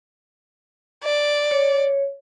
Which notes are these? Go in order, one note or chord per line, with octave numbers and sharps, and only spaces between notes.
D5
C#5